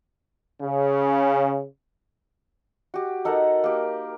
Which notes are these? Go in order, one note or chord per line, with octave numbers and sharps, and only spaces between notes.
C#3
F#4 G4
D#4 A4 A#4 F#5
A#3 G4